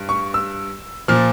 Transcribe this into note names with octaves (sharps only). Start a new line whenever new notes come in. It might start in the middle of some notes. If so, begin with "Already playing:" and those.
Already playing: G2 G3
C#6
E6
A#2 F3 F6